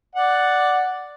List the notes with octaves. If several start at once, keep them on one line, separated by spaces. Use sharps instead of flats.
D5 F#5